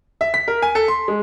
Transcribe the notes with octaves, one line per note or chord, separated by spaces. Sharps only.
E5
B6
A#4
G#5
A4
C6
G#3